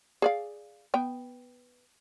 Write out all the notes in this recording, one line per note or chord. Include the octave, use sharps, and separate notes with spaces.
G#4 D5 F5
B3 G5